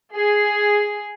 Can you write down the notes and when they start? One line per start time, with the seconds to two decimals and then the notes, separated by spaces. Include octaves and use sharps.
0.15 G#4